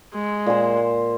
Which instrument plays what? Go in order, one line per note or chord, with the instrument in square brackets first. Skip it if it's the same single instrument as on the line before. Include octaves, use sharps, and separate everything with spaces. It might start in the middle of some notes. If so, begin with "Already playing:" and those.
[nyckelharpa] G#3
[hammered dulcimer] A#2 C5